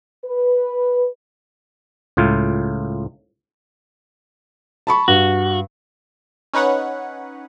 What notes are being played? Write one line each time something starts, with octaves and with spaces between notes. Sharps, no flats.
B4
C#2 A2 F4
A5 B5 C#6
G2 F#4
C#4 D#4 B4 C#5 F#5